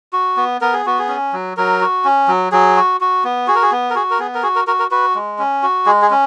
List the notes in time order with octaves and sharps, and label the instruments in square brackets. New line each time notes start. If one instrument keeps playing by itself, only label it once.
[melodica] F#4
B3
B3 A#4
G#4
B3 F#4
G#4
C#4
F#3
F#3 A#4
F#4
C#4
F#3
F#3 G#4
F#4
F#4
B3
F#4 G#4
A#4
G#4
B3
A#4
F#4 G#4
A#4
B3 G#4
A#4
F#4 G#4
A#4
F#4 A#4
A#4
F#4 B4
G#3
C#4
F#4
G#3 G#4
G#4
C#4